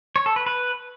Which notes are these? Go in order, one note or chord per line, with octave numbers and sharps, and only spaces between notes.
C#5
A4
B4
B4